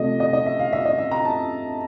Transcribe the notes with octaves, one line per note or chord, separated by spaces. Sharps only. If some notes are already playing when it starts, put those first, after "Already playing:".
Already playing: C3 F3 A3 D#5
D#5
D#5
E5
F5
E5
D#5
E5
A#5
A5